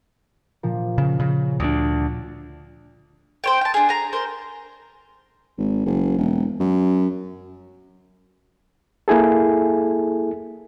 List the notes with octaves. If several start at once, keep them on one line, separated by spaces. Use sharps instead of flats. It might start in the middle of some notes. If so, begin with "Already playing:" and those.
A#2 F3
C#3
C#3
D2 D4
C5 C#5 G5
G5 A5
D4 G#4
G#4 A#5
A#4 C5
G#1
F#1
E1
F#2
A#3 E4 G#4 A4